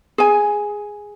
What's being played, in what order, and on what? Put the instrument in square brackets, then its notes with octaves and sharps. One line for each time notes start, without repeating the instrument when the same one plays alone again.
[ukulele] G#4 G#5